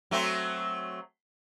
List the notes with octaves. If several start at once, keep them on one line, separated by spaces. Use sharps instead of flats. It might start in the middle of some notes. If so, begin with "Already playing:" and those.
F#3 A3 C4